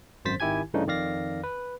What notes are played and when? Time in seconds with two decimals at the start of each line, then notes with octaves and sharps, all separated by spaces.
0.25 G#1 F#2 C5 A6 B6
0.40 G#1 D#3 E4 G4 G#5 G#6
0.74 G2 C#3 E3 A3 D4 D#4
0.87 F2 D#3 D5 F5 A#6
1.44 B4